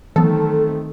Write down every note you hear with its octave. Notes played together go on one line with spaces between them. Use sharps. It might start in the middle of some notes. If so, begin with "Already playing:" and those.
D#3 E3 F#3 A3 B3 C4 A4